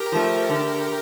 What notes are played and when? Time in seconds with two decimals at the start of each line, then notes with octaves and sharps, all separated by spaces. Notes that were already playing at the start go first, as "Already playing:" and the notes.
Already playing: G4 A#4
0.12 F3 A3
0.50 D3